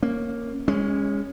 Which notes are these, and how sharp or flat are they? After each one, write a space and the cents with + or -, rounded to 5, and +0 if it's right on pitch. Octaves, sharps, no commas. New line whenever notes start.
A#3 +0 C#4 -15
G#3 -25 C#4 +0